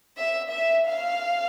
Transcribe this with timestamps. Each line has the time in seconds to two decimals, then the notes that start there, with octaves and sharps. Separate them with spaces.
0.17 E5
0.53 E5
0.88 F5